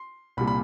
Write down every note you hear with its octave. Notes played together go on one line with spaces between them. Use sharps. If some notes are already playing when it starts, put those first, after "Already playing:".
Already playing: C6
C2 A#2 G3 B5
B5